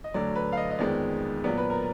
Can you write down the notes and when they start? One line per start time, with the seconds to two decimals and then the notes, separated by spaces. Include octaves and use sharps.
0.04 D#5
0.14 D2 D3 F#3 D5
0.36 B4
0.53 F5
0.57 D#5
0.71 D#5
0.79 F2 D#3 G#3 B3 D5
1.44 A#2 F#3 B3 D5
1.58 B4
1.70 A#4